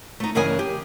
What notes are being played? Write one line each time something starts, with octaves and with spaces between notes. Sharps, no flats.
A3 D#4
G2 C#3 E3 A#4 D#5 G#5
G4